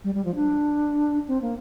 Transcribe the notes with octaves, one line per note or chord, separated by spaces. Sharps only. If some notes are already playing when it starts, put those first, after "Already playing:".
G3
G3
F3
D4
C4
A#3